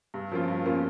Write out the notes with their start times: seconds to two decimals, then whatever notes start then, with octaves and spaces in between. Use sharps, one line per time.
0.14 G2
0.31 F3 A#3 C#4 F4
0.48 G2
0.65 F3 A#3 C#4 F4